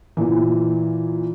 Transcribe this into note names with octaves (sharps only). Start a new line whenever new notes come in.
A#2 E3